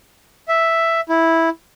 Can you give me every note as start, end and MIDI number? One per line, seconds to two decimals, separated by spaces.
0.48 1.01 76
1.09 1.49 64